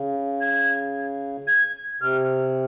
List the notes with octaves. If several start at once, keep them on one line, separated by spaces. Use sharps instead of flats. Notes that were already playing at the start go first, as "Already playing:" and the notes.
Already playing: C#3
G#6
G#6
C3 F6